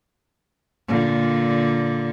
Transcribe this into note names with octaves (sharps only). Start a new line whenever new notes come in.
A#2 D3